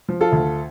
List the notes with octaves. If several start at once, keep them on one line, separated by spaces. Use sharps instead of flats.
F3
F4 A4
D2